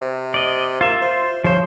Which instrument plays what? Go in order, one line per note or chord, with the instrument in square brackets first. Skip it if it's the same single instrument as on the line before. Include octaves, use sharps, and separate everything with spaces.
[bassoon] C3
[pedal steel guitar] D5 D#5
[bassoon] A#3 [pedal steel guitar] F4 E5
[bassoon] C5
[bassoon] C#3 [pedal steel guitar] F3 C5